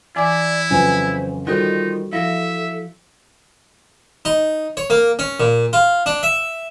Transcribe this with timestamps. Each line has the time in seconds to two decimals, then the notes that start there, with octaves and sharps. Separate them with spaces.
0.16 E3 E4 D5 G#5 D6
0.70 F2 C#3 F#3 B4 C5 G#5
1.47 D#3 G3 D#4 F4 F#4 A4 C5
2.13 F3 E4 A4 E5 A#6
4.25 D#4
4.77 C#5
4.90 A#3
5.19 C#4
5.40 A#2
5.73 F4
6.06 D4
6.23 E5